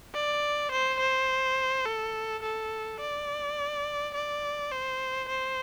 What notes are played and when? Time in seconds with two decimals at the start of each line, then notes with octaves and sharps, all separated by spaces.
0.14 D5
0.72 C5
1.00 C5
1.86 A4
2.43 A4
3.00 D5
4.15 D5
4.72 C5
5.29 C5